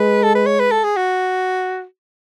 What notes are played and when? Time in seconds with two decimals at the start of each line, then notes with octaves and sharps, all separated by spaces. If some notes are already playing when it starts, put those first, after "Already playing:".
Already playing: G#3 B4
0.23 A4
0.35 B4
0.46 C#5
0.59 B4
0.71 A4
0.84 G#4
0.96 F#4